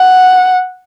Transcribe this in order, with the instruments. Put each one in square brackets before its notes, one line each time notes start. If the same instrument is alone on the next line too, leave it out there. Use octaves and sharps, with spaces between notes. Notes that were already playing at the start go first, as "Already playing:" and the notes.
Already playing: [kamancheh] F#5